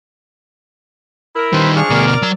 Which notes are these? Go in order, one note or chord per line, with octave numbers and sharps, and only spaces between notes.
E4 A#4
D#3 G3 B4 C5
F3 D4 G#4 C#6 F6
D2 B2 A#4 D5
F6
F#3 A#5 E6